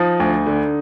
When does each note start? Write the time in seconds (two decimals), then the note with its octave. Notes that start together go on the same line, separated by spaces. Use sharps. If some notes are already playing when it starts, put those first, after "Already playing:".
Already playing: F3 D#4
0.20 D2
0.46 D3